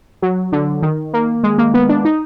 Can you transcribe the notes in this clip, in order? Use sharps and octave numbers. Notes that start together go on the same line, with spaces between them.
F#3
D3
D#3
A#3
G#3
A#3
B3
D4
D#4